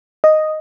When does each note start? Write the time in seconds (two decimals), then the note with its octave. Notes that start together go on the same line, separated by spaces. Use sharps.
0.24 D#5